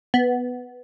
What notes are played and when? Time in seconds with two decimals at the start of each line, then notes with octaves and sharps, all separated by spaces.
0.14 B3